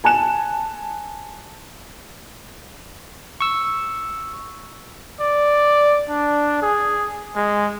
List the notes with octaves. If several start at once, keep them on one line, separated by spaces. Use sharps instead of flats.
G#5 A5 F#6 E7
C#6 E6
D5
D4
G#4
G#3